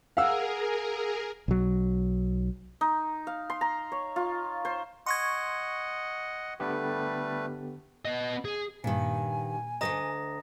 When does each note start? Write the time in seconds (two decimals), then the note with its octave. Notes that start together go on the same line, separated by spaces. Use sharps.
0.17 G#4 A#4 F5 F#5 E6
1.48 B1 F#3
2.81 D#4
3.27 F5
3.50 C6
3.61 A#5
3.92 C#5
4.16 F4
4.65 C5
5.06 D#5 F#5 C6 C#6 G#6
6.60 D3 G3 A3 B3 G4 B4
8.05 B3 D#5
8.45 G#4
8.84 G2 A#2 D#3 G#5
9.81 D2 D#3 D#5 A#5 D#6 A#6